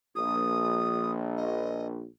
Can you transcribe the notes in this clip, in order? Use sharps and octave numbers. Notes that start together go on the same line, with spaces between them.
A#1 D#6
D#5